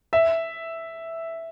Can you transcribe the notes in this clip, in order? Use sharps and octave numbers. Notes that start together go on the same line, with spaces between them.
E5